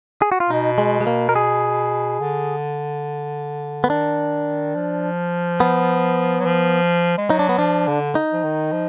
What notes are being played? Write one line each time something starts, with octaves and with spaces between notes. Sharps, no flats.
G#4
F#4
F4
B2 D#4
G#3
G#3
A#3
A#4
G#4
D3
B3
D#3 D4
F3
B3
F#3
F3
G#3
F#3 D#4
D4
B3
F3 D4
D3
D#4
F3
D#3
F3